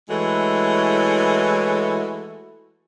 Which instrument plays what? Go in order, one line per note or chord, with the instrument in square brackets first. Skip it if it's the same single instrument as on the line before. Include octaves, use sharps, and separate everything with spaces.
[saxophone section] E3 G#3 A3 E4 F#4 C#5